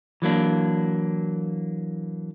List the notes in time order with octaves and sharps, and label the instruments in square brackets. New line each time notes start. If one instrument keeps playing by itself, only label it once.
[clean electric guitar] E3 F#3 A#3 D4